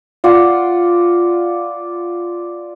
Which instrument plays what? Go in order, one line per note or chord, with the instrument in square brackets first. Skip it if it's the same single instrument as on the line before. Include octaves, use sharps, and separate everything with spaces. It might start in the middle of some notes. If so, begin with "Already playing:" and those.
[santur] F4 D5 F#5